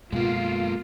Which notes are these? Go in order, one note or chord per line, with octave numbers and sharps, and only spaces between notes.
F#2 B2 G#3 A#3 F4